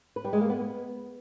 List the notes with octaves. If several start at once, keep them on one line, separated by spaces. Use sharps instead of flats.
B4
G3
G#3
A#3
B3